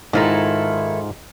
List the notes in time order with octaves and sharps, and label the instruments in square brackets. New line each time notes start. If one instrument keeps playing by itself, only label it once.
[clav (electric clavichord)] G#2 F4 A#5 [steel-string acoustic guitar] D#3 E4 A4